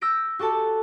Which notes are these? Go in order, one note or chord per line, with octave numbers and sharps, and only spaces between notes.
E6 G6 A#6 D7
F#4 G4 A4 A5